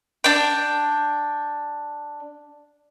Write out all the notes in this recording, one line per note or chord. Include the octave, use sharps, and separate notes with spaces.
D4 G5